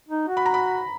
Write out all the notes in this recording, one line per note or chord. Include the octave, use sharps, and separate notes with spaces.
D#4
F#4
B5
A#5
B5